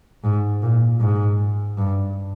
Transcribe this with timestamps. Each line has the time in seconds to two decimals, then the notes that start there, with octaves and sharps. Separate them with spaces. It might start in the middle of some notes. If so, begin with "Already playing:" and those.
0.24 G#2
0.62 A#2
1.01 G#2
1.78 G2